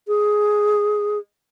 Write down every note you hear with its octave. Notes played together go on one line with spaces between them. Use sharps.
G#4